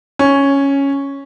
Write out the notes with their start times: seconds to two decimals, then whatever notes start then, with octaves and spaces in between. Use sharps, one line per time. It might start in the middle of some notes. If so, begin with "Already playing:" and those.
0.19 C#4